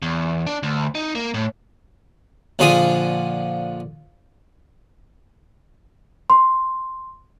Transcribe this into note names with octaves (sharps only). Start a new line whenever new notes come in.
E2
D4
D2
D#4
A#3
A2
A#1 D3 F3 G#4 D#6
C6